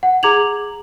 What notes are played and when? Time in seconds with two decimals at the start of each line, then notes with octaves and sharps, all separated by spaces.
0.03 F#5
0.23 G#4 A#5 D6 G#6 F7 F#7